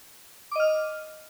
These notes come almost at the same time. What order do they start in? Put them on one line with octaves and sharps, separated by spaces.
D6 D#5 F6